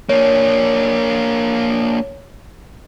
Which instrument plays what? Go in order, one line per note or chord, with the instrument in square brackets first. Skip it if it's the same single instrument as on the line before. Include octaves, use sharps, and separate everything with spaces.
[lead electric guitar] A#3 D4 [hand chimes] C#5